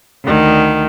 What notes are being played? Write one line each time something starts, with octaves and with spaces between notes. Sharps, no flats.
D2 D#3